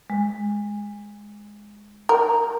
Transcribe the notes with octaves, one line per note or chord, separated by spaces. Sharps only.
G#3
A#4